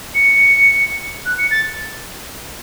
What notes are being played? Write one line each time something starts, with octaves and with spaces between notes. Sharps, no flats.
C#7
F#6
C#7
A6